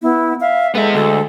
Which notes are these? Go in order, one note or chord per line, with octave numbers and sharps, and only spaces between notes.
B3 E4
E5 F5
G#3 B3 A4 E5
D2 A4